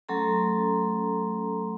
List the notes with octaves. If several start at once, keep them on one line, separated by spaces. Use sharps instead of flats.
F#3 A3 C#4 A4 A#5 C6